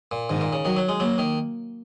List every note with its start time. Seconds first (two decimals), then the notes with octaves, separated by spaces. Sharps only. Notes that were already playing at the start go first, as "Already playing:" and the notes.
0.11 A#2
0.29 G#2 D#3
0.41 A#2
0.53 C#3
0.65 D#3 F#3
0.77 F#3
0.89 G#3
1.00 F#3 A#3
1.18 D#3